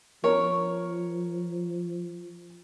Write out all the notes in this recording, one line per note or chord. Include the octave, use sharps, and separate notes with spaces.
F3 A#4 C#5